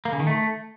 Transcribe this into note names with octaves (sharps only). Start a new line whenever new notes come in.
A#3
C#3
D#3
A3